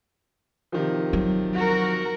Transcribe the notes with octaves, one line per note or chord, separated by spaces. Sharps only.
C3 D#3 F3
F#3
F#4 A#4